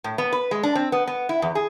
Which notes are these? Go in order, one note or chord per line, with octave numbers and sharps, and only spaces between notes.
A2
B3
B4
G#3
D4
C4
B3
B3
E4
E2
G#4